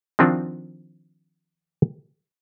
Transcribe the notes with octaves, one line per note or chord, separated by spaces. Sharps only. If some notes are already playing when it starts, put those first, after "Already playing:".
D#3 F3 C4 D4 F4 F#4